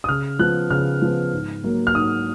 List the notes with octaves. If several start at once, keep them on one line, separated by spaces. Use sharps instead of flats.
D#6
C#3 F6
F3 B3 F#6
C#3 F6
F3 B3
G#2
F#3 A#3
F6
G#2 D#6